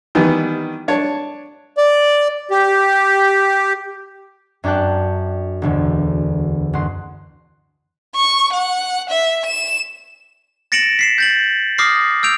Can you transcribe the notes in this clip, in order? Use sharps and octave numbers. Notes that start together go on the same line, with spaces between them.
D#3 E3 G3 B3
D4 C#5 A5
D5
G4
F#2 D4 D5 G5 A5 F#6
E1 D2 D3
F#1 F#5 C6
C#6
F#5
E5
E7
A6 A#6 C#7 D7 E7 F#7
B6 C7 E7
G6 A6 F#7
D6 D#6 F6 A#6 C7
E6 G6 D7 F7